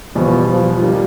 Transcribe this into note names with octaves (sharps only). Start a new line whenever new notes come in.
E2 B2 F3 G3 B3
F3
D#3 G3 A#3